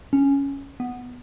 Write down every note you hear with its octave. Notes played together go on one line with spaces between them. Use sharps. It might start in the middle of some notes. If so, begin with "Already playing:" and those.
C#4
B3